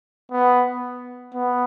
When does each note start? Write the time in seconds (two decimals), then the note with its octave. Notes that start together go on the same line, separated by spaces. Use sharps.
0.32 B3
1.34 B3